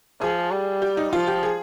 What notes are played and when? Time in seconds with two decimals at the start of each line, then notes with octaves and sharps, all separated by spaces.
0.21 F3 G#4
0.52 G3
0.82 G4
0.97 D#4
1.13 F3 F4
1.27 G4
1.43 G#4